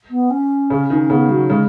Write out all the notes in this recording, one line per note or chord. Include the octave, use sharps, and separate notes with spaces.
B3
C#4
C#3
D#3
C#4
C#3 B3
F#3
C#3 G#3